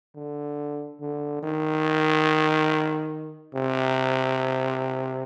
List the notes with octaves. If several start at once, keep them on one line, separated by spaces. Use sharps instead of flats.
D3
D3
D#3
C3